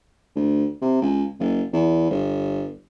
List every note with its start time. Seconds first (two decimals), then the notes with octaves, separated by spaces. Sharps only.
0.36 D2
0.81 C3
1.02 C#2
1.40 F#1
1.73 E2
2.10 G1